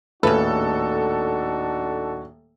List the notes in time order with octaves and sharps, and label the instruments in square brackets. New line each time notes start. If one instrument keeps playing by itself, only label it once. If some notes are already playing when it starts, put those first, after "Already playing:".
[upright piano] D#1 A2 [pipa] C#3 B4 [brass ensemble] D4 D#4 F#4 [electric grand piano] A4